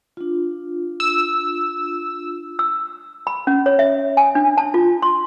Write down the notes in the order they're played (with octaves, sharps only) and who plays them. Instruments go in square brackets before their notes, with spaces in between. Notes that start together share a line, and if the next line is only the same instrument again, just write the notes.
[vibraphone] D4 F4
[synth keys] E6
[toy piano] E6
B5
C#4
C#5
E5
G#5
D4
A5
F4
C6